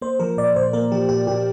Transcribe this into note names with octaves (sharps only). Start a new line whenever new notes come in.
A#3 C5
F3 A#4
A#2 D5
A#2 C5
A#3 A#4
F3 G4
A#2 G4
A#2 G4